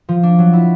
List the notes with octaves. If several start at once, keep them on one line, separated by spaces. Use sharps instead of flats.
F3
D4
F#3
E4